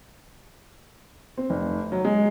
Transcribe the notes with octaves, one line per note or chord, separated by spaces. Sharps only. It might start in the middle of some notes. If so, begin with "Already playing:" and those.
C4
F1
F#3
G#3